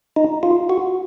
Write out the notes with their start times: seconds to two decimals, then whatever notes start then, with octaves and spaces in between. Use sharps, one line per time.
0.16 D#4
0.43 F4
0.69 F#4